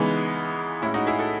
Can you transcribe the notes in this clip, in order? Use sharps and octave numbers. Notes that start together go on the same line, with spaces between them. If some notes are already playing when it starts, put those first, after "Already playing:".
Already playing: C#3 E3 G#3 B3 D#4
A2 G#3 C#4 E4
D#4 F#4
E4 G#4
F#4 A4